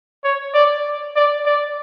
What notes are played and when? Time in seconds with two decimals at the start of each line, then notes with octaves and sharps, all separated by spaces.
0.24 C#5
0.54 D5
1.16 D5
1.46 D5